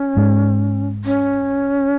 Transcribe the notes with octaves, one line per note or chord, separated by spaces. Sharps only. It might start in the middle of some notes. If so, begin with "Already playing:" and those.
Already playing: C#4
G#2
C#4